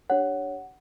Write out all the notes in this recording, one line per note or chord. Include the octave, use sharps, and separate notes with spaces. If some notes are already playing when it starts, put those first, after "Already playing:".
D4 G4 C#5 F#5